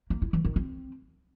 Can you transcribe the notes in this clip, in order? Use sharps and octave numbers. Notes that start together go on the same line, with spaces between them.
A#3
E4
E3
D#3
C4